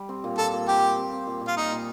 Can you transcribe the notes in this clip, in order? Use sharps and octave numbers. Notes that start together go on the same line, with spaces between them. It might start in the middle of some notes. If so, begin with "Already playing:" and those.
Already playing: G3
C4
A#2
A#2 A4
A#2
C4 G4
C4
C4
C4
A#2
A#2
F4
A#2 D#4
A#2